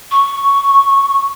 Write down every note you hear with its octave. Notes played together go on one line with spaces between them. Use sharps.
C#6